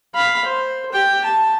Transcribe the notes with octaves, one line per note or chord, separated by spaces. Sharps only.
F5 B5
C5
G4 G5
A5